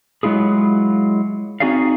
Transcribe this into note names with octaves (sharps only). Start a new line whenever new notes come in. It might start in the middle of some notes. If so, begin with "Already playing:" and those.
F#3 G#3 E4 F4 G#4
C4 D#4 F#4 G#4 D5 F5